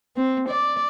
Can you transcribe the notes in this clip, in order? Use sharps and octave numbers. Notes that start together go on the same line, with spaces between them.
C4
D5